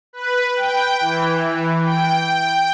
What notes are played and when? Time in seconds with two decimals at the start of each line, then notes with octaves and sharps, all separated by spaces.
0.13 B4
0.56 G5
1.01 E3
1.84 G5